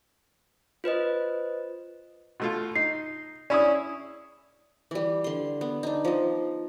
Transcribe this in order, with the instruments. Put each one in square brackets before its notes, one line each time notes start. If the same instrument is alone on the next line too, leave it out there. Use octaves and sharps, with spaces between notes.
[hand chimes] F4 B4 C5 D#5
[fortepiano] B2 A3 F4
[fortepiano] D#4 [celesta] C7
[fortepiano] C#4 E4 G#4 [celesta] D5 D#6
[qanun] E3 G3
D3 C6
B3
D4 D#4
F3 D#5